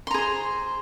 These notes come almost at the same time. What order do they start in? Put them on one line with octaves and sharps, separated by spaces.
C6 A#5 G#4 C5